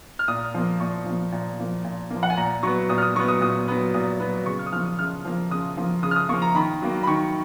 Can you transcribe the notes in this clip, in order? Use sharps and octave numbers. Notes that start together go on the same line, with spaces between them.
F6
A#2 D#6
F3 A#3
A#2 C#6
F3 A#3
A#2
F3 A#3
A#2
F3 A#3
F#5
G#5
A#2 A#5
F#3 B3 C#6
A#2 D#6
F6
D#6
F#3 B3 C#6
D#6
A#2 D#6
F#3 B3
A#2 D#6
F#3 B3
C#3 C#6
F6
D#6
F3 A#3 F6
D#6
C#3 F6
F3 A#3
C#3 D#6
F3 A#3
C#3 D#6
F6
D#6
F3 A#3 C#6
A#5
D#3 B5
F#3 A#3
B5
D#3 C#6